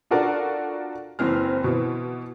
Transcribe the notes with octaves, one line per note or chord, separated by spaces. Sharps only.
D4 F4 F#4 A4 A#4 D5
F#1 E3 C4 F6
B2 E3